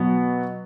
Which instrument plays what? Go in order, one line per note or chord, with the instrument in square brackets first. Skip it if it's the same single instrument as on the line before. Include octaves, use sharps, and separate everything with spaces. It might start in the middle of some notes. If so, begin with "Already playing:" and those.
Already playing: [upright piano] B2 F#3 B3